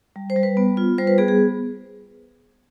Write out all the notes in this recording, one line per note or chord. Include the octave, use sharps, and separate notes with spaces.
G3
C5
G3
B4
B3
F4
G3 C5
B4
B3 G#4
G#4